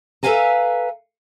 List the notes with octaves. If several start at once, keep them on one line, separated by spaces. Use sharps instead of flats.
A4 B4 E5 F5 G#5 A#5